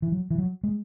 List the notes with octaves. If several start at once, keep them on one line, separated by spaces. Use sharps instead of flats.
E3
F#3
E3
F#3
G#3